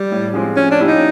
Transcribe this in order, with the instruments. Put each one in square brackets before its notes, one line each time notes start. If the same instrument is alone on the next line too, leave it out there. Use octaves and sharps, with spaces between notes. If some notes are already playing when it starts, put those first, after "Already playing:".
Already playing: [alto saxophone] G3
[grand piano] A2
F3 G#3 C4
[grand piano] F3 [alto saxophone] C#4
[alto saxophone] D4
[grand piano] A#3 C#4 E4 G4
[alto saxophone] D#4